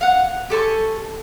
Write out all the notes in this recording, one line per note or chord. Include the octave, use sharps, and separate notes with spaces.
F5 F#5
G4 A4 G#5 C#6